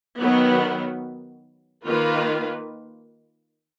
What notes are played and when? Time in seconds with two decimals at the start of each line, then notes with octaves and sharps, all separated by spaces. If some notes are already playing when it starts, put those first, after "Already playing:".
0.18 D#3 F#3 B3
1.85 D#3 A#3 F4 B4